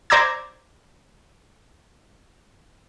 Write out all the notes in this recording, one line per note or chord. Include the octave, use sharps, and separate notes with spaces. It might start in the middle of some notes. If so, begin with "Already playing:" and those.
C5 D5 A#5 D6 E6 G#6